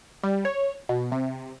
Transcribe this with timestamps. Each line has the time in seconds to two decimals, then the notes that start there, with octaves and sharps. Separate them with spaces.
0.23 G3
0.45 C#5
0.89 B2
1.12 C3